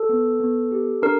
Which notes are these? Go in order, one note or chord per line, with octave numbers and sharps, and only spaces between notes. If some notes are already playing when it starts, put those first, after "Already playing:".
Already playing: A4
B3
B3
G4
D4 A#4